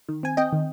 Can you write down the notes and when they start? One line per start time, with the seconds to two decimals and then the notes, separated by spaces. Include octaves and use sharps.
0.09 D#3
0.23 C4 G#5
0.37 C4 D#5 G5
0.52 D#3